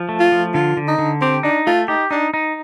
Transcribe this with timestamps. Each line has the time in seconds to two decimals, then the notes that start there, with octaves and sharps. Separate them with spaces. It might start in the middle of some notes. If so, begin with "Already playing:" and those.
Already playing: F3
0.09 A3
0.20 F4
0.32 F3
0.54 D3 F4
0.77 D3
0.88 D#4
0.98 D3
1.21 C4 G4
1.43 D4 D#4
1.67 A3 F4
1.88 D#4 G4
2.11 D4 D#4
2.34 D#4